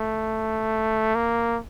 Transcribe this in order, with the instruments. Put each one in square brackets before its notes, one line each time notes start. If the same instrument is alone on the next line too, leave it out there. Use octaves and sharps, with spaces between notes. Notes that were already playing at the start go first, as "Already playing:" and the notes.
Already playing: [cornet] A3
A#3